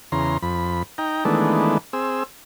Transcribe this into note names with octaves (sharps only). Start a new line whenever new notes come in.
E2 C#3 A#5 C6
F2 B5
D#4 G5 A#5
D#3 E3 G#3 A3 B3 D4
C4 G#4 E6